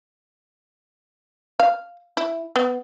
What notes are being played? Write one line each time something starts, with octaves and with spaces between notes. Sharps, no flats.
F5
E4
B3